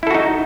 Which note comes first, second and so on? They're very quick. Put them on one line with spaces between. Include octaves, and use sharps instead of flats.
E4 A4 F#4 D#4